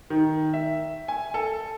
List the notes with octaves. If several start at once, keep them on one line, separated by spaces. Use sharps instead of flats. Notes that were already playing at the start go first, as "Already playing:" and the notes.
D#3
E5
G#5
A4